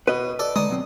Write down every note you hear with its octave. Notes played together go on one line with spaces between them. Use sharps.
B2 B4 D#5
A4 D5 D6
D3 G#3 D#4 D5 D#6
B2 F#3 C4